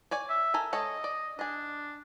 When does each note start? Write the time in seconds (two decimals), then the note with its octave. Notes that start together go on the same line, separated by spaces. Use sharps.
0.11 C#5 D5 G#5
0.29 E5
0.54 A4 A#4 G#5
0.73 G#3 A4 C#5 D#5
1.04 D5
1.39 D4 G#4 D#5